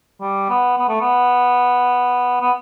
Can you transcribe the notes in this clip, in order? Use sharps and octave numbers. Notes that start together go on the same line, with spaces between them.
G3
B3
B3
A3
B3
B3